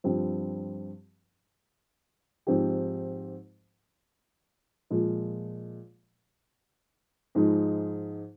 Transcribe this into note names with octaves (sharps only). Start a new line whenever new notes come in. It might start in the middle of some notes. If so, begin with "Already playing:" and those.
G2 F3 C4 G4
G#2 F3 C4 G4
A#2 F3 G#3
G#2 F3 G#3 D#4